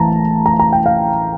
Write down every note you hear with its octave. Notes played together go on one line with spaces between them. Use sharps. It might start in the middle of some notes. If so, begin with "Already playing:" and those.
Already playing: A1 A2 E3 A5 A#5
A#5
A#5
G5
F5